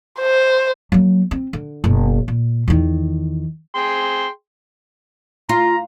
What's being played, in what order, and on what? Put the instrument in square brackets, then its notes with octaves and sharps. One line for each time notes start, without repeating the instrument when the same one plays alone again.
[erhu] C5
[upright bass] F#3 A#3
C4
D3
F#1 B2
A#2
E2 D#3
[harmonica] G#4 G5 C6
[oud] F4 [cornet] A#5